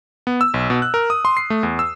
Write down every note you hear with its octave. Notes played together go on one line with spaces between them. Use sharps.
B3
E6
B1
B2
F#6
A#4
D#6
C6
C7
A3
E2
E6